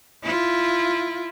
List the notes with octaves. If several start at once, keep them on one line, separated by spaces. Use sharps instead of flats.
E4 F4